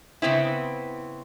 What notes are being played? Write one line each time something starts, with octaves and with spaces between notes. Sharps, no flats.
C#3 B3 C4 E4